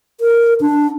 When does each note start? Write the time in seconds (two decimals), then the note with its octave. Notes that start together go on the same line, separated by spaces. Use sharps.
0.21 A#4
0.61 D4